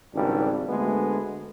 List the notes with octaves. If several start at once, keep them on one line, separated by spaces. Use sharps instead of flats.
G#1 C#2 G3 D4
D2 G#3 A3 B3